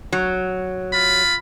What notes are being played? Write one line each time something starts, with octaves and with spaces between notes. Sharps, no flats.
F#3
F4 B5